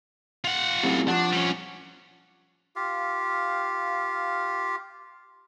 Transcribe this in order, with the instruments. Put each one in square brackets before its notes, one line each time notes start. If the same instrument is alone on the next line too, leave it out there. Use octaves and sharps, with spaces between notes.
[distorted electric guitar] F4 F#5
[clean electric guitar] F#2 A2 C3
[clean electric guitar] F3 F#5 [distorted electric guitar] D4
[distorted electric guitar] G3 C#4
[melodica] F4 G4 F5